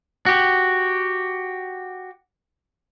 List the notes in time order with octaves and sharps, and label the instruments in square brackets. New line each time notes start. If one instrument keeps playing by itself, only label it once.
[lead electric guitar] F#4 G4